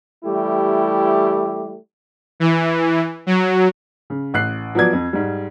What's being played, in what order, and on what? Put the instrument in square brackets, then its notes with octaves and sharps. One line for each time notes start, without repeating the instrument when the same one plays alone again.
[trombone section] E3 G3 A3 E4 G4
[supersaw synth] E3
F#3
[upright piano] C#3
A1 F#6 C7
F3 F#3 B3 D5 G#6
F2
G#2 G3